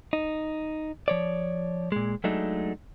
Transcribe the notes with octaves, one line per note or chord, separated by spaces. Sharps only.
D#4
F3 C#5 D5
A#2 G#3
F#3 G#3 A3 D4 D#4